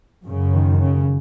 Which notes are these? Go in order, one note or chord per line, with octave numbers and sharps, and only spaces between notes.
F#2 C#3
D#3
C#3